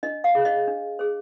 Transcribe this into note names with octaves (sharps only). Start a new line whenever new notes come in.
D4 D#5
F5
G#4 C5
D#5
D4
G#4 C5